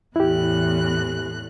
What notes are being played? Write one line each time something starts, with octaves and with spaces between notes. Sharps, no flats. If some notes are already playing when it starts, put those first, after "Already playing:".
E2 A2 E4 G4 F#6